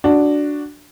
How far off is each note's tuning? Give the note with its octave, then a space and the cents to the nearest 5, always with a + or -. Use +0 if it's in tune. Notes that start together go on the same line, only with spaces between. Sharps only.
D4 +0 F#4 +0